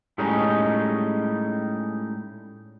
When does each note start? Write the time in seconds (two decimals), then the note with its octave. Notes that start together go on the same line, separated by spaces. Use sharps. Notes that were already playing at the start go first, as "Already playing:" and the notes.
0.18 A2 G3 G#3 C#4 D#4